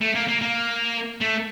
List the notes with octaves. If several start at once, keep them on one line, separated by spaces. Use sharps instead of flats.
A3
A#3
A#3
A#3
A3